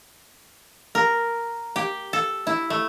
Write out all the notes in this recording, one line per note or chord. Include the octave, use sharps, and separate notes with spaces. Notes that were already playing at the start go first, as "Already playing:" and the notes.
A#4
G4
A4
E4
A3